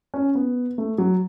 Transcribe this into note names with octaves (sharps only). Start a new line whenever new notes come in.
C#4
B3
A3
F#3